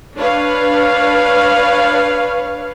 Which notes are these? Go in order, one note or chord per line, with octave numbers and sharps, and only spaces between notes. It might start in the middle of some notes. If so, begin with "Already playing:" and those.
D4 B4 C#5 F5